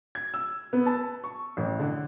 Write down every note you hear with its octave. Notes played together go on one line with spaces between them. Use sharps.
G#6
E6
B3
A5
C#6
A1
D3